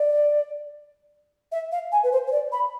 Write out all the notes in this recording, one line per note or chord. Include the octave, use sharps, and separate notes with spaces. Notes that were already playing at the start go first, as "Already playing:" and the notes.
Already playing: D5
E5
F5
G#5
B4
C5
C5
D5
B5